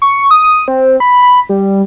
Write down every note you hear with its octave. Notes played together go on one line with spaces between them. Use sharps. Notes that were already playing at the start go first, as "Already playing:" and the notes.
C#6
D#6
C4
B5
B5
G3